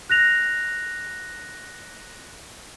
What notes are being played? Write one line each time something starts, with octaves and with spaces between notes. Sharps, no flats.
F#6 A#6 F7